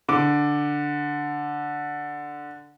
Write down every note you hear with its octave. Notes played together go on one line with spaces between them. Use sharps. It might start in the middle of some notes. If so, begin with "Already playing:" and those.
D3 D6